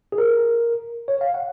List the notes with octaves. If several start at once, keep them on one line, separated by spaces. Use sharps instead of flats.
G#4
A#4
C#5
F5
F#5